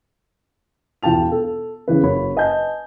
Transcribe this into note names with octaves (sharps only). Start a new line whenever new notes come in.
E1 E3 F4 G5 A5 F7
A4
C#3 E3 B4
F#1 A#4 C#5 B5
B4 D#5 G#5 A5 G6